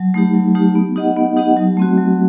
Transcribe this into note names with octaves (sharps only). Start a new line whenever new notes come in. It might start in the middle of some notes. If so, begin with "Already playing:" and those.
Already playing: F#3
A3 D#4 G4
F#3
A3 D#4 G4
B3
D#4 G4 D#5 F#5
B3
D#4 G4 D#5 F#5
F#3
A3 C4 F#4
F#3